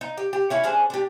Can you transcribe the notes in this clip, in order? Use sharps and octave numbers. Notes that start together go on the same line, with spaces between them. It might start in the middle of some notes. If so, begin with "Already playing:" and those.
D#4
G4
G4
C#4 E4 C#5
C#4 D4 G#4 C5
D4 G4